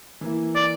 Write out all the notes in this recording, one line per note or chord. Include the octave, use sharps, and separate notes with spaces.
E3 A#3 E4
D5